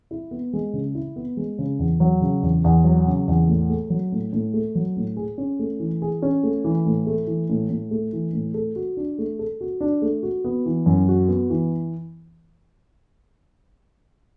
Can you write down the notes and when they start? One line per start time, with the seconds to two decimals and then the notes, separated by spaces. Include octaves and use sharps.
0.11 E4
0.31 B3
0.53 G#3
0.73 C#3
0.95 E4
1.16 B3
1.37 G#3
1.58 C#3
1.79 E2
2.00 F#3
2.22 C#3
2.42 E2
2.64 E2
2.84 F#3
3.07 C#3
3.27 E2
3.48 A2
3.69 A3
3.90 F#3
4.12 A2
4.33 A2
4.54 A3
4.75 F#3
4.96 A2
5.17 G#4
5.38 C#4
5.59 A3
5.80 E3
6.02 G#4
6.22 C#4
6.43 A3
6.64 E3
6.86 A2
7.07 A3
7.27 E3
7.49 A2
7.70 A2
7.91 A3
8.13 E3
8.33 A2
8.54 A4
8.76 F#4
8.97 D4
9.18 A3
9.39 A4
9.61 F#4
9.81 D4
10.02 A3
10.23 F#4
10.44 B3
10.66 E3
10.86 F#2
11.08 F#4
11.28 B3
11.50 E3